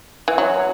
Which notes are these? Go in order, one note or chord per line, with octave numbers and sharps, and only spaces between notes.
E3
F#3